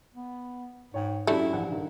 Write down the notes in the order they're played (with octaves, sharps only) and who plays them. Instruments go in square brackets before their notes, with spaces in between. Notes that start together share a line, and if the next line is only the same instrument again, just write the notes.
[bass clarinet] B3
[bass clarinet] G#2 [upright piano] C#5 G5
[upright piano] F#2 F#3 [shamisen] G3 A3 D4 [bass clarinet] E4
[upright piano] A#1 E3 F#5
G2 D#3